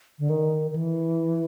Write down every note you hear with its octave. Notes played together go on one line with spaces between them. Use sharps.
D3
D#3
D#3
E3